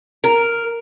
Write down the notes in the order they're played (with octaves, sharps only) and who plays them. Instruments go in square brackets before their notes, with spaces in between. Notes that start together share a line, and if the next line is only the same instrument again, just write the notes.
[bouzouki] A#4